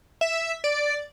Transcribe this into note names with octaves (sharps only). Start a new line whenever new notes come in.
E5
D5